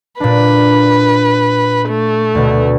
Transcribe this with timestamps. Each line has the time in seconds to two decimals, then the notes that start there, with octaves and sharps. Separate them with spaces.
0.20 A#2 D4 B4
1.89 A3
2.35 D2 B2